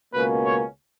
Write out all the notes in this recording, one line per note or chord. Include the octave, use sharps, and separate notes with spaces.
C#2 B2 A#3 C#4 B4
C#5